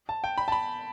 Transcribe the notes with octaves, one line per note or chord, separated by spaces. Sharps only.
A5
G5
B5
A5
B5